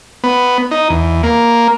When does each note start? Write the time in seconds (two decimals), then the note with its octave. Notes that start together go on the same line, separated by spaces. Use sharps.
0.24 B3
0.71 D#4
0.90 E2
1.24 A#3